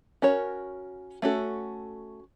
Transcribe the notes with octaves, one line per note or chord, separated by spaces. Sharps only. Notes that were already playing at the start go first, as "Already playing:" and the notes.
C#4 F#4 A#4 C#5
A3 C#4 F#4 A4